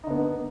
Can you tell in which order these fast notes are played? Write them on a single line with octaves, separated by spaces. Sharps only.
D#4 D3 B3 A#3